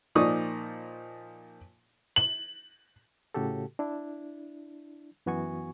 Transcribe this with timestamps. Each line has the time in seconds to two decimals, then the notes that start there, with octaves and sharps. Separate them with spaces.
0.15 A#2 F3 D#4 D5 C#6 D#6
2.16 F#7
3.34 A2 C#3 F#4 G4 A4
3.79 D4 E4
5.26 F#2 E3 B3 F#4 G#5 C#6